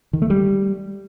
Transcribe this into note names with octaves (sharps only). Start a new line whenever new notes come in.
D#3
A3
G3